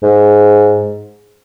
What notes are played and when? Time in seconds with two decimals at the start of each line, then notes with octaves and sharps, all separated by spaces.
0.03 G#2